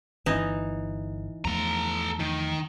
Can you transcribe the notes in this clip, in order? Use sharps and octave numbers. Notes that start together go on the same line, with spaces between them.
G1 E3 D#4
E2 F3 A3 A4 A#5
D#3